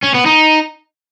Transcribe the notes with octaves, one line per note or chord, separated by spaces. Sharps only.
C#4
B3
D#4